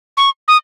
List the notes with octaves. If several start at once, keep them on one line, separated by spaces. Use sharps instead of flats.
C#6
D#6